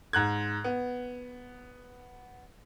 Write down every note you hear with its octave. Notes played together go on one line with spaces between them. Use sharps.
G#2 F#6 G#6
B3